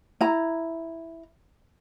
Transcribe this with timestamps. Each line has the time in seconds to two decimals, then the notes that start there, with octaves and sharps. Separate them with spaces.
0.21 E4 A#5